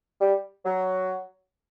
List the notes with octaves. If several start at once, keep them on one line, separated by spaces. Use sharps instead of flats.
G3
F#3